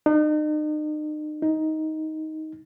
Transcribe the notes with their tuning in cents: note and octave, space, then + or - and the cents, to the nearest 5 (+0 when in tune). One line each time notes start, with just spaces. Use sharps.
D#4 -40
D#4 +10